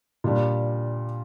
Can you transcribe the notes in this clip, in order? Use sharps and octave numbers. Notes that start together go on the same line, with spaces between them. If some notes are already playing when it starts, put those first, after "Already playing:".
A#2 G3 D4